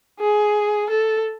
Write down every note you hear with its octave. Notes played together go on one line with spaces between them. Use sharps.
G#4
A4